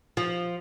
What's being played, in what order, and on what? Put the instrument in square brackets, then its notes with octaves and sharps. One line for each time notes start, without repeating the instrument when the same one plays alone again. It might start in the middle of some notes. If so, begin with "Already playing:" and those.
[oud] F3